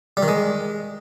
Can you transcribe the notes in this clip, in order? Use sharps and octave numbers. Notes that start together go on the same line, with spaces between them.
G3
D#3
G#3